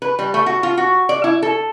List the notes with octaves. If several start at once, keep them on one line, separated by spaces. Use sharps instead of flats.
B4
G3
A3
F#4
F4
F#4
D5
E4
A4